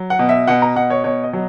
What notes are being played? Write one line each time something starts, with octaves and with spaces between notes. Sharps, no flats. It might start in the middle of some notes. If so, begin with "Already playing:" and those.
Already playing: F#3
F#5
B2
E5
B2 F#5
A#5
B2 F#5
C#5
B2 C#5
D#5
F#3